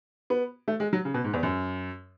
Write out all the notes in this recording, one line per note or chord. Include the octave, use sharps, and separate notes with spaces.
B3
A3
G#3
F#3
C#3
B2
G#2
E2
F#2